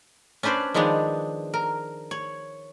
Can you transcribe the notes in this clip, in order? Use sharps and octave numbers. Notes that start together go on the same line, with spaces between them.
C#4 D4 B4 C5 D5
D#3 F3 G#3 B3 D4 G#4
A#4
C#5